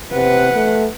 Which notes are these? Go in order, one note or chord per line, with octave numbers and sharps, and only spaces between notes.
C3 B4 F#5
A3